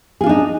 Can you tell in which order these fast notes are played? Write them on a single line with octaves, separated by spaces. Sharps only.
G#4 F4 D4 D#4